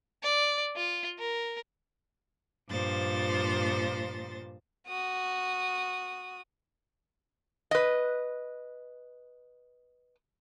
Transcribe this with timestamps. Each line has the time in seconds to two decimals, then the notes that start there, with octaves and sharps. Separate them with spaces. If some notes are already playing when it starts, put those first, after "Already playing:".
0.23 D5
0.76 F4
1.19 A#4
2.70 G2 A#2 F3 C5 A6
4.88 F#4 D#6
7.71 B4 D#5